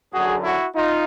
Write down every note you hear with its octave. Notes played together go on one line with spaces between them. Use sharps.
F#2 D3 F#3 F#4 G#4
E4 F#4
D#4 F4